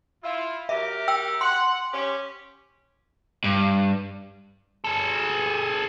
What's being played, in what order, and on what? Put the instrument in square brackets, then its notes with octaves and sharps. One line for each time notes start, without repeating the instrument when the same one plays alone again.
[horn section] E4 F4
[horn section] F#3 G4 A#4 [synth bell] E5
[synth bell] G5 E6
[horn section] F#5 [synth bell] C6
[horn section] C#4 G4
[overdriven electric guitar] G2
[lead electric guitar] G#4 A4